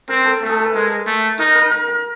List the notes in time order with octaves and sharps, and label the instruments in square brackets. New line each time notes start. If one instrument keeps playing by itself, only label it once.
[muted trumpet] C4 [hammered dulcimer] A#4
[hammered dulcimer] A4
[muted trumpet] A3 [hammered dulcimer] A4
[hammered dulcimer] G#4
A4
B4
[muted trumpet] G#3 [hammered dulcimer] A#4
[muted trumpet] A3
[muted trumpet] D#4 [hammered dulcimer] A#4
[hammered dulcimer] A#4
A#4
A#4